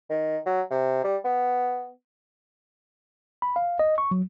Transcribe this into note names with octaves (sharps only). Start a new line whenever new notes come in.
D#3
F#3
C3
G3
B3
B5
F5
D#5
C#6
F#3